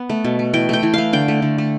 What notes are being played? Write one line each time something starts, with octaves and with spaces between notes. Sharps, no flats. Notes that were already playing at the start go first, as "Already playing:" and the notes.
Already playing: B3
A3
B2
A3
E3 G5
A3 G5
E3
A3 F5
D3 G5
A3
D3
A3